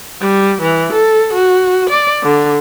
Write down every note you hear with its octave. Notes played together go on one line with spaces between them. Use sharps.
G3
E3
A4
F#4
D5
D3